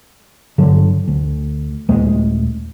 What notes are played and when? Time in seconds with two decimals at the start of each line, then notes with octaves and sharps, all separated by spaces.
0.58 G2 D3 F#3
1.08 D2
1.89 D#1 D#2 G#3 A3